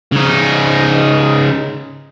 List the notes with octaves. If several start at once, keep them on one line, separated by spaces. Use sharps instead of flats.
C#3 D#4